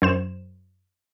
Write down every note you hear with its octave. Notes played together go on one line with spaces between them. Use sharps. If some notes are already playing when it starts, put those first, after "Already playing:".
F#2 C5 E7